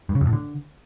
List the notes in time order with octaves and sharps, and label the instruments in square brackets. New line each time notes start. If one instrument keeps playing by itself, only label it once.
[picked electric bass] G2
C#3
F2
A2
D3